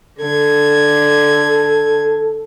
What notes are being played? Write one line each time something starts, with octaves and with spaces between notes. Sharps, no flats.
D3 A4 G#6